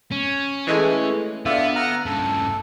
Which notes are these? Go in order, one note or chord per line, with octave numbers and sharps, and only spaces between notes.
C#4
E3 G#3 A3
D3 B3 F4 D5 E5
F#5 A#5 F6
G2 C#3 A4